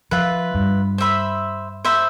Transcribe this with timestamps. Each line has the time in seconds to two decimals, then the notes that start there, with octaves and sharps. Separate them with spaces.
0.11 F3 F4 B4 E5
0.55 G2
0.98 C5 E5 B5
1.85 C5 E5 B5